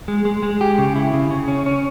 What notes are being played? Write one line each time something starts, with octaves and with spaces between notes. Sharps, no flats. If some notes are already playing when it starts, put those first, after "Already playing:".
G#3
G#3
G#3
G4
C#3
E4
C#3
C#3
C#4
C#4